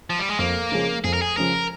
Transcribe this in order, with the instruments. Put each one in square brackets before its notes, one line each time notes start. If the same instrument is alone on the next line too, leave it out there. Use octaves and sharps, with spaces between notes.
[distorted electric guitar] F3
G3
G#3
[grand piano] F2 [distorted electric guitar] A#3
[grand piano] C#3 F3 G#3 C#4
[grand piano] F2 [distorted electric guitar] G#4
[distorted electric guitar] A#4
G#4
[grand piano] C#3 F3 G#3 C#4 [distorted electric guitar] A#4